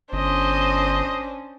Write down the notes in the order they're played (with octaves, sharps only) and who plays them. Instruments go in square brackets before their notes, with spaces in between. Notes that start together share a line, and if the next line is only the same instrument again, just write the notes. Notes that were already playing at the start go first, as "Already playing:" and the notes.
[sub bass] G1 [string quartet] C#4 D4 [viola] C5 D#5